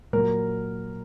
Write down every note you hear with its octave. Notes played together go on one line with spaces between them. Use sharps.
A#2 F#3 A#4